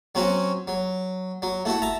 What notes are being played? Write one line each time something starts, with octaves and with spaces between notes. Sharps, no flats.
F#3 C4 C#4 F#4
F#3
F#3
A3 E4 F#4
E5 A5 A#5